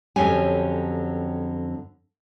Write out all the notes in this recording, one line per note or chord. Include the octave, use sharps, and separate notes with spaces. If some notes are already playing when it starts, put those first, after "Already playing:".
F2 D3 F#3 C#4 G4 G#5